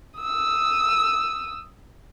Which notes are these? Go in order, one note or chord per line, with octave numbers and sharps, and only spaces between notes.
D#6 E6